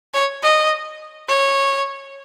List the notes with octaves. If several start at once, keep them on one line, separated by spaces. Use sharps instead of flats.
C#5
D#5
C#5